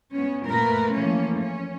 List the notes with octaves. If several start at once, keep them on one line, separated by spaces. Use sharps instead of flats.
B3 C#4
A#2 A3 A#4 B4
E3 F3 A3 A#3 C#4
C#4